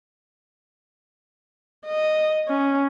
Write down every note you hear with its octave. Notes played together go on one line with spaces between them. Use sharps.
D#5
C#4